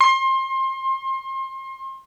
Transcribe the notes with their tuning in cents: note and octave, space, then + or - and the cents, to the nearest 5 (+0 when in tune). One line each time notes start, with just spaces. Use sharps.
C6 +30